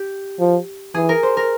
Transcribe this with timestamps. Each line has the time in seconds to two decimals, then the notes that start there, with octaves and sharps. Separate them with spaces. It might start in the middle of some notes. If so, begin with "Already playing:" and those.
Already playing: G4
0.40 F3
0.94 E3 G#4
1.09 A#4
1.23 C5
1.37 A#4